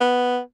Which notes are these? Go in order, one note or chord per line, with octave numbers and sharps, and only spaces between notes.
B3